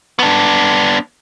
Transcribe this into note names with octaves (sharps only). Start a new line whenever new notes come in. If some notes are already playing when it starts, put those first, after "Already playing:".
B3 D4